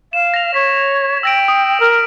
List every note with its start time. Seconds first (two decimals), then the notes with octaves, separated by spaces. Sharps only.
0.13 F5 E7
0.34 A#6 F7
0.54 C#5 B6
1.23 G5 E6 A#6 D7
1.48 D#6
1.80 A#4